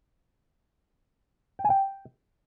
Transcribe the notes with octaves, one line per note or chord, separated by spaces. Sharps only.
G5
G#5
G5